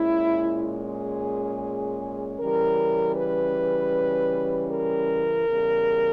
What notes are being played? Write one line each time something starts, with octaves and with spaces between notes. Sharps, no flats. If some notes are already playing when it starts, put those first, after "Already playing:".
Already playing: A#2 G#3 C#4 E4
G#4
C#3 E3 G3 C#4 A#4
B4
A#4
E2 C#3 G3